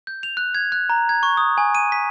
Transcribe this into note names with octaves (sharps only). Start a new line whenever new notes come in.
G6
F7
F#6
G#6
F#6
A#5
G#6
C#6
D#6
G#5
D#7
B6